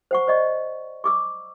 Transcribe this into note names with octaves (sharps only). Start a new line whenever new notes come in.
C5 F#5 C#6
C5 D5 D#5 C#6
C#6 D6 E6